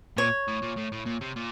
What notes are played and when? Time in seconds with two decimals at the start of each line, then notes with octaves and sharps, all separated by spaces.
0.17 A#2 C#5
0.48 A2
0.62 A#2
0.77 A2
0.92 A2
1.06 A#2
1.21 C3
1.36 A#2